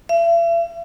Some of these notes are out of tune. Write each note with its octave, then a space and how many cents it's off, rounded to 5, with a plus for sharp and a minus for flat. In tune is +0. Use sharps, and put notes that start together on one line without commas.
E5 +40